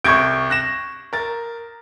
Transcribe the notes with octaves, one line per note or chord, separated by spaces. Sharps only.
C2 C#6 G6 G#6 D7
F#6 A#6 E7
A#4 A6